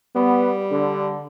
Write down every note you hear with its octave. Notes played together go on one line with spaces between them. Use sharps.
G3 B3
D3